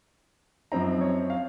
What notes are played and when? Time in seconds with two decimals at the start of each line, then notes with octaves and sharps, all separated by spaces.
0.72 F#2 F3 C4 D#4 A#5
1.01 C#5
1.30 F5